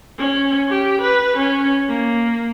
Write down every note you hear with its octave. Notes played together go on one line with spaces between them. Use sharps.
C#4
G4
B4
C#4
A#3